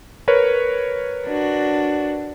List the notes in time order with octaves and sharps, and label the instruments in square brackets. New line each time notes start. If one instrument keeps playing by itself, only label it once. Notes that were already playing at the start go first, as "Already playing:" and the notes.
[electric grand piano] A#4 B4 C#5
[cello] D4 F#4